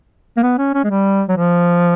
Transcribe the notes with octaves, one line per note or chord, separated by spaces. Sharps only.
A#3
B3
C#4
C#4
G#3
G3
F#3
F3